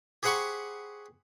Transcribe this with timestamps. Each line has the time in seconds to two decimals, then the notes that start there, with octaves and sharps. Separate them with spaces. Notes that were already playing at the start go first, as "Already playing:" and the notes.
0.23 G4 G#4 C5 F#5 B5 C#6